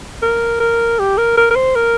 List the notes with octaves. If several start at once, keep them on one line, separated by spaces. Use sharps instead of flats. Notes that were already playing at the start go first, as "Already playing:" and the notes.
A#4
A#4
G4
A#4
A#4
A#4
C5
A#4